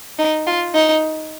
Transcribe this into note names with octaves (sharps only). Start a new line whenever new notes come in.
D#4
F4
D#4